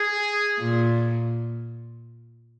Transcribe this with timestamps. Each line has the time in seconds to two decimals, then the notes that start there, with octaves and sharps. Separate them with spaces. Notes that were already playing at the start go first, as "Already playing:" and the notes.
Already playing: G#4
0.59 A#2